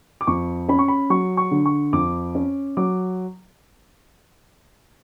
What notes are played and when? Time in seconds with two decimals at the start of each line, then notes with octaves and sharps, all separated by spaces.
0.21 D6
0.27 F2 C#6
0.69 C#4 B5
0.79 C#6
0.88 B5
1.10 F#3 C#6
1.37 C#6
1.51 D3
1.66 C#6
1.93 F2 D6
2.35 C#4
2.77 F#3 D6